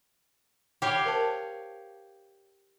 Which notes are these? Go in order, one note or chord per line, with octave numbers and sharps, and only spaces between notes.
G4 C#5 F5 F#5 B5
A#4 C5 A5